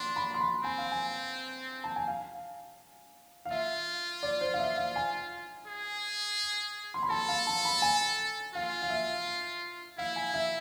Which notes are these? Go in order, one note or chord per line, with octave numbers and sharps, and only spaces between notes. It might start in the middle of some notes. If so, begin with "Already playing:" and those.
Already playing: D4 C6
B5
C6
B5
C4 G#5
F5
G#5
A5
G#5
F5
F5
F4 E5
D5
C5
F5
E5
F5
G#5
G#4
C6
B5
A4 A5
F5
A5
B5
G#5
F4 F5
F5
E5
E4 F5
G#5
E5